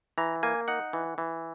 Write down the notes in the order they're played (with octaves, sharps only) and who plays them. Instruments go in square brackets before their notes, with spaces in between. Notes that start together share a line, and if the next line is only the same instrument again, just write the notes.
[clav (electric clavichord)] E3 A#5
A#3 G#5
D#4 F#5
E3
E3